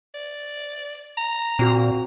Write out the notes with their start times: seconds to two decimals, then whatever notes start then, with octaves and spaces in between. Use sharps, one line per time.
0.15 D5
1.17 A#5
1.59 A#2 C4 F#4